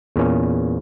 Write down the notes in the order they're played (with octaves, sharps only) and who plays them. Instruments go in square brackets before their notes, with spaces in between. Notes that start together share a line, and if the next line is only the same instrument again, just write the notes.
[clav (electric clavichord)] E2 A#2 C#4